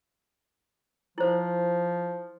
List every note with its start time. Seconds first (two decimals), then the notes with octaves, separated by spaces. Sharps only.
1.18 F3 E4 C5